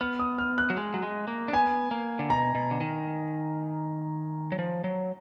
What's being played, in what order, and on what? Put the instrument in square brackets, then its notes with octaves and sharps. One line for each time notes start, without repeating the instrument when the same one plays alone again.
[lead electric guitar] B3 [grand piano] F6
[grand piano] D#6
F6
F#6
[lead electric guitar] F#3
G#3
F#3
G#3
A#3
D4
[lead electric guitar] B3 [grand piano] G#5
[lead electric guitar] A#3
D3
[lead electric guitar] B2 [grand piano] A#5
[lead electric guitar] B2
D3
D#3
F#3
F3
F#3